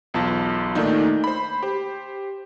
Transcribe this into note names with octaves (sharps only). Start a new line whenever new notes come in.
B1 E2 F4 A5
A#2 D#3 A3 A#3 D4 D#4
C5 B5
G4 C5